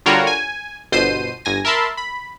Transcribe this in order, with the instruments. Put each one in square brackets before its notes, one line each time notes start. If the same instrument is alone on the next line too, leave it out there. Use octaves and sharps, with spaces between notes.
[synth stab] D3 G3 F4 F#4 A#4 C#5
G#5
G1 B2 C5 C7 D#7
G1 G#5 A#6
A#4 E5 A5 B5 C6
B5